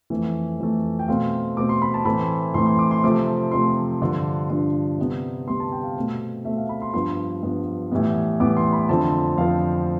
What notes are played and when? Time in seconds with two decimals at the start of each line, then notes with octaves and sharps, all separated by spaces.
0.10 F2 E3 A3
0.59 F2 E3 A3
0.99 G5
1.08 B2 A3 C4 F5
1.57 B2 A3 C4 D6
1.69 C6
1.82 B5
1.94 A5
2.05 A2 E3 A3 C4 B5
2.54 A2 E3 A3 C4 C6
2.66 C6
2.79 D6
2.91 C6
3.03 C3 F3 A3 C4 D6
3.51 C3 F3 A3 C4 C6
4.01 G2 D3 F3
4.49 G2 D3 F3
4.98 C3 G3 B3
5.47 C3 G3 B3 C6
5.60 A5
5.72 G5
5.83 F5
5.95 B2 A3 C4
6.45 B2 A3 C4 E5
6.57 F5
6.69 B5
6.82 C6
6.93 G2 F3 B3 C6
7.43 G2 F3 B3
7.91 A2 E3 G3 B3
8.40 A2 E3 G3 B3 D6
8.57 C6
8.73 B5
8.89 F2 D3 F3 C4 A5
9.38 F2 D3 F3 C4 F5